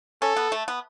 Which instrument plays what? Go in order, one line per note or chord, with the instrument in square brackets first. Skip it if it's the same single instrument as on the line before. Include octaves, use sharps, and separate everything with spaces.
[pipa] C#4 [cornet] A4
[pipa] B3
A3
B3